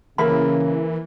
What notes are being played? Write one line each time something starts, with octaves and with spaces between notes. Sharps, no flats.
C#3 E3 A#3 G#4 E5 B5